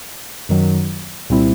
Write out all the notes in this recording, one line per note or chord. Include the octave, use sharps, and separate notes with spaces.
F#2 D#3 F#3
C2 A#2 G3 C4 E4